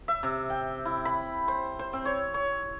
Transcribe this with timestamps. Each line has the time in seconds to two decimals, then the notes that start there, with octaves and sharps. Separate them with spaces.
0.08 E5
0.23 C3
0.50 G5
0.85 E4
1.05 B5
1.48 C5
1.79 C5
1.93 C4
2.05 C#5
2.34 C#5